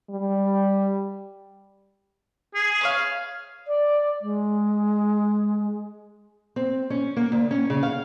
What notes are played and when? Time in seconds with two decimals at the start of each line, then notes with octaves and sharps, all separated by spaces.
0.10 G3
2.55 G#4
2.81 B4 C#5 F5
3.68 D5
4.22 G#3
6.56 C4
6.90 C#4
7.17 A#3
7.32 D2
7.51 C#4
7.70 C#3
7.83 F5